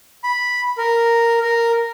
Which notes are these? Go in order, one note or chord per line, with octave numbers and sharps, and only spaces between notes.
B5
A#4
A#4